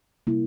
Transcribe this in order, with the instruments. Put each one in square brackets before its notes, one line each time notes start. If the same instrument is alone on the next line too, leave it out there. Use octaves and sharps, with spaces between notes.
[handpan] C3 G3 A#3 E4